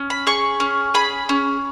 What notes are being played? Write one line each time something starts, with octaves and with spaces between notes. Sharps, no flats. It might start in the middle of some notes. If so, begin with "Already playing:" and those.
Already playing: C#4
B5
G#4 C#6
C#4
G#4 B5
C#4